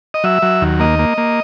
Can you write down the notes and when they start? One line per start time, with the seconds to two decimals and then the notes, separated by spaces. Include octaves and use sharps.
0.14 D#5
0.24 F#3 E5
0.42 F#3
0.62 D#2
0.80 A#3 D#5
0.99 A#3
1.18 A#3